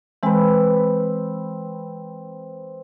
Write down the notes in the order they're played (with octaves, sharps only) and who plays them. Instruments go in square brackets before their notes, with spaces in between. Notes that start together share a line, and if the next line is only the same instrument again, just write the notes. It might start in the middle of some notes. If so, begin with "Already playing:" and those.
[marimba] E3 G#3 [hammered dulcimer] C4 B4